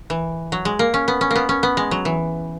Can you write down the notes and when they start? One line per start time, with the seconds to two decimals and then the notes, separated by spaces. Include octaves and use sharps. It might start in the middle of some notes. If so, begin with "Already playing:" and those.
0.10 E3
0.52 F#3
0.65 G#3
0.79 A#3
0.94 C#4
1.08 B3
1.21 C#4
1.31 A#3 B3
1.49 C#4
1.63 B3
1.77 G#3
1.91 F#3
2.05 E3